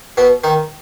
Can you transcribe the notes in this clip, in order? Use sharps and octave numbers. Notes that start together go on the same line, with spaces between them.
B2 B3
D#3 D#4